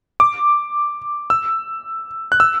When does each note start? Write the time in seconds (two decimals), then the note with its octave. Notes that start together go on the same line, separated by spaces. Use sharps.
0.20 D6
1.30 E6
2.32 F#6
2.40 E6